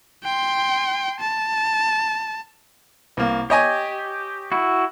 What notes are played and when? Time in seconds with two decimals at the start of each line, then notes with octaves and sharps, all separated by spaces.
0.23 G5 C6
1.20 A5
3.17 C2 A#3
3.50 G4 C#5 D#5 G#5
4.52 E4 F#4